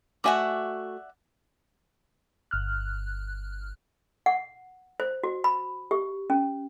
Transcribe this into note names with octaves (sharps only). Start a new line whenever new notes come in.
A3 F#4 D5 E5 F#5 G#5
G1 F6 F#6
F#5
C5
F#4
B5
G4
C#4